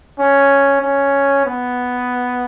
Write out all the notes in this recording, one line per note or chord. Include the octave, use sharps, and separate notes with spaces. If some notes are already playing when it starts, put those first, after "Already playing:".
C#4
C#4
B3